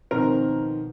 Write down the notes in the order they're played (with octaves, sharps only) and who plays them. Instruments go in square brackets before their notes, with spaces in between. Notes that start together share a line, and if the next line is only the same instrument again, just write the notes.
[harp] B2 [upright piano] D#3 F3 [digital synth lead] C4 [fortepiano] A#4